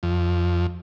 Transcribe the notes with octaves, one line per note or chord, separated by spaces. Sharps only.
F2